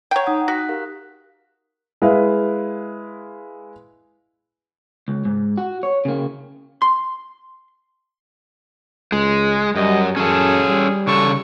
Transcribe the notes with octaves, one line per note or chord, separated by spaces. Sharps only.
C#5 F#5 G5 A#5
D#4 F#5 D#6
F#4 F#6 B6
G4 A#4 F5
G#3 E4 B4 F5
C#2
G#2
F#4
C#5
C#3 A#3
C6
C#2 G#3
F#2 G3 D#5
F#2 C#4 G#4 A4
G3
C#3 A4 C#6